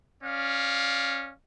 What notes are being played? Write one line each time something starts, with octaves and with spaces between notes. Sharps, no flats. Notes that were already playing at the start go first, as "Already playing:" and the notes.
C#4 D5 F5